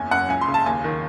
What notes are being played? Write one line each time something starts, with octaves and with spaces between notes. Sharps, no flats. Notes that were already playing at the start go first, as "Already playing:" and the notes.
Already playing: F#1 E2 G#5
F#2 F#5
C#2 G#5
C6
C#3
A5
D#2 G#5
D#3